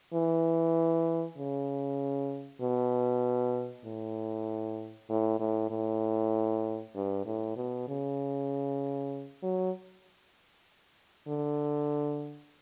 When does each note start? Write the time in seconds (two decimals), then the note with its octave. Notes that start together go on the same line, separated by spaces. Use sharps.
0.14 E3
1.38 C#3
2.61 B2
3.85 A2
5.10 A2
5.40 A2
5.71 A2
6.95 G2
7.26 A2
7.56 B2
7.88 C#3
9.43 F#3
11.28 D3